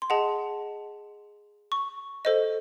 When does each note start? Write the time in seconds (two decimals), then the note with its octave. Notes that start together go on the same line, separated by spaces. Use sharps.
0.02 C6
0.10 G#4 D#5 F#5 A5
1.72 C#6
2.25 A4 C5 D#5